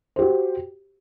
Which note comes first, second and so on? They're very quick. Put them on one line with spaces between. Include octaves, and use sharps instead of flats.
C5 G4 F#4